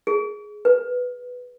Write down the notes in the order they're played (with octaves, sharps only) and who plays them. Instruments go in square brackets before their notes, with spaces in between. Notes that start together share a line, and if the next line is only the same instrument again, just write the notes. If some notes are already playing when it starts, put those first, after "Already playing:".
[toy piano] G#4
B4